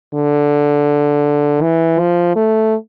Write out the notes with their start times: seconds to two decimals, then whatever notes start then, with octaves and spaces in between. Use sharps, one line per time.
0.14 D3
1.62 E3
1.99 F3
2.36 A3